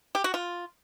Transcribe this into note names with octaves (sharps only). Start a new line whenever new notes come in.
G4
F#4
F4